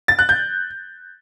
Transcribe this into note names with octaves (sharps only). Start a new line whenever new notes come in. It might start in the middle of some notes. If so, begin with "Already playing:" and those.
A6
F#6
G6